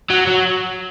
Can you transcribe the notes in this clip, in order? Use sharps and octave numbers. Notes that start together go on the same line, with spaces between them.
F#3
F#3